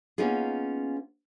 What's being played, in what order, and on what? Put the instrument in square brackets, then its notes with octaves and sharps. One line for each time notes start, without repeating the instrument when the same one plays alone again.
[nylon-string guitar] A#3 B3 C#4 D#4 F4 G#4